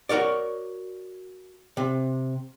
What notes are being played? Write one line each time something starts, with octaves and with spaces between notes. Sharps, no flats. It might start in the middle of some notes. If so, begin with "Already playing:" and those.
F#4 A#4 C#5 D5
C3